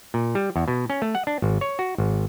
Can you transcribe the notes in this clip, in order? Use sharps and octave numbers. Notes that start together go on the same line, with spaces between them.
A#2
G3
E2
B2
C#4
A3
F#5
D4
G#1
C#5
F#4
G#1